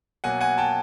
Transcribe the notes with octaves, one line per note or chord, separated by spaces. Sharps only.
B2 F#3 A#3 F#5 G#5
F#5 G#5
G5 A5